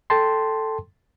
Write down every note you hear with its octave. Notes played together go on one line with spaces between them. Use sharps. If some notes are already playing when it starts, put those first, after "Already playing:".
A4 G5 A5 C6